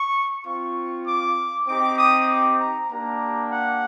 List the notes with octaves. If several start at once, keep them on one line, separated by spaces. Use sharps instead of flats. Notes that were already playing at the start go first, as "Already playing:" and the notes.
Already playing: C#6
C4 F4 C#6
D6
C4 D#4 G4 D6
D#6
D6
A#5
A#3 D4 G4 A#5
F#5